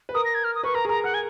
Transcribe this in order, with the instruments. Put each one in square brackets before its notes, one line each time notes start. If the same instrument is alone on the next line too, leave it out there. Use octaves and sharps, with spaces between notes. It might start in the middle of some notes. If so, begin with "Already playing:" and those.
[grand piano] B4
[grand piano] A#4 [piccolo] D#6
[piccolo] A#6
G#6
F6
D#6
[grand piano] B4 [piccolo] C#6
[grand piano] A#4 [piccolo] A#5
[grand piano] G#4
[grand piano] A#4 [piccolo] A#5
[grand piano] A#4 [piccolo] F#5
[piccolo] G#5